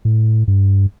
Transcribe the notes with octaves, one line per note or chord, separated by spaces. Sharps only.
A2
G2